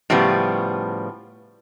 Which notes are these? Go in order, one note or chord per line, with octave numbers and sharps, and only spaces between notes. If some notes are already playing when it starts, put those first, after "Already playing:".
A2 C#3 F3 G3 B3